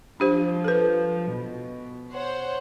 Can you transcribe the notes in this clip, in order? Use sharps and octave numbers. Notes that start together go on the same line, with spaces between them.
F3 D4 G4 C5
A4 B4
B2
C5 C#5 F#5